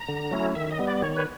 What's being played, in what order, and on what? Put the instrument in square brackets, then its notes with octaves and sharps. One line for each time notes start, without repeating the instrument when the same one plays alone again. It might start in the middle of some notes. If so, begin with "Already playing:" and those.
Already playing: [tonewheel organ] A#5
D3
F#3 A3 C#4 E4
D#3 E5
D#5
G3 B3
D5
D#3 C#5
B4